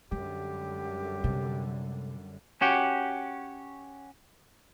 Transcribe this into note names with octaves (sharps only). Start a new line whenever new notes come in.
F#2 D3 G3 G#3 G4
C3 G#3
C#4 F#4 G4